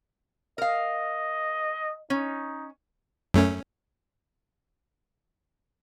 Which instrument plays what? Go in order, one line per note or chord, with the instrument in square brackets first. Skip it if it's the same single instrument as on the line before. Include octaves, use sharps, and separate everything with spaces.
[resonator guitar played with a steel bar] A#4 F5 [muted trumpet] D#5
[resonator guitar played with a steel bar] C#4 [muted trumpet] D#4
[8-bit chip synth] F#2 A3 C#4